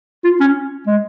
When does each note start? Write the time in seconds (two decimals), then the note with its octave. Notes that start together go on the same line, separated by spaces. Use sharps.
0.24 F4
0.40 C#4
0.87 G#3